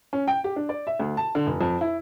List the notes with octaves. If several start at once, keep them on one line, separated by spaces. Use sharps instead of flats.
C#4
G5
G4
D4
D5
E5
D2
A5
D3
F1
F2
E4